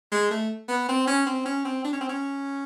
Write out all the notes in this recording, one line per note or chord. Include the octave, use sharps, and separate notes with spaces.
G#3
A3
B3
C4
C#4
C4
C#4
C4
D4
C#4
C4
C#4